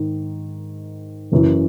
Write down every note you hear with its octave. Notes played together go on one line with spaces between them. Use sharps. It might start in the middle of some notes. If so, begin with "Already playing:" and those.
Already playing: G#2 D#3
F#1 F#2 C#3 E3